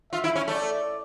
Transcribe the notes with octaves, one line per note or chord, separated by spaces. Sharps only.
F4 E5
E4
C#4
A3 D5